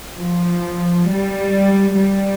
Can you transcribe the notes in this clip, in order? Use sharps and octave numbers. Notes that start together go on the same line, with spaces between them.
F3
G3
G3